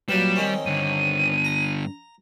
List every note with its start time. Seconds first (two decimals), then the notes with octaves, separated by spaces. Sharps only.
0.09 A#2 F#3 G3 B4 E7
0.36 D#3 C4 C#4
0.66 G2 D3 D#7
1.45 A#5